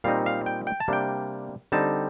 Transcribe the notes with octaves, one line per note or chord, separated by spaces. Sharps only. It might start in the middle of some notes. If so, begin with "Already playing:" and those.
A#2 G3 C4 D#4 F5
F5
G5
G5
A5
C3 G3 A#3 D4 G5
D3 G3 C4 D#4 A5